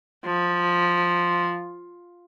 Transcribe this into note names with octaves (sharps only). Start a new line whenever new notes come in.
F3